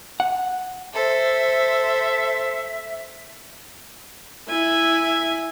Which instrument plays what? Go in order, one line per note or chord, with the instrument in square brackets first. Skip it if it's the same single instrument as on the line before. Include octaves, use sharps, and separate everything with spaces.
[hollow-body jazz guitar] F#5
[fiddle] A4 C5 [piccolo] E5
[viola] E4 E5 [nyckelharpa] G#5